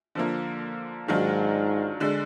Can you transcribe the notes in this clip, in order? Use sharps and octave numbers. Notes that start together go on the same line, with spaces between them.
D3 F3 A#3
G#2 D#3 F#3 D4 F4
D3 G#3 D4